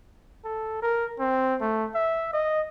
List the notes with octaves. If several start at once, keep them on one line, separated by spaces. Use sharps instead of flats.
A4
A#4
C4
A3
E5
D#5